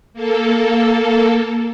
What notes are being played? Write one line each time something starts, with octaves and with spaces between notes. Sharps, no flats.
A#3 A4